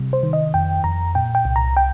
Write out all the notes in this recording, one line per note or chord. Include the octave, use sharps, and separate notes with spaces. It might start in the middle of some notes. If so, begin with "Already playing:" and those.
Already playing: C3 G3
C5
D#3
D#5
F2 G5
F2 A#5
A#2 G5
G5
C2
A#5
G5